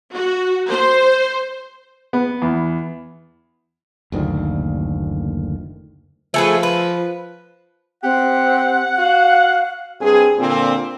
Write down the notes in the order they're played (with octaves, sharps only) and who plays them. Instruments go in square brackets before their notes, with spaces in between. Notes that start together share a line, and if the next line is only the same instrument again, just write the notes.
[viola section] F#4
C5
[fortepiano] B3
E2
[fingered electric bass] F#1 D2 A#2 D#3
[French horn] F3 [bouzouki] A3 G#4 B4
[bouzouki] B4
[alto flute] C4 [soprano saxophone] G4 [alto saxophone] F#5
[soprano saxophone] F#4 [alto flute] F5
[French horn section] G2 C4 G#4
A#2 D3 C4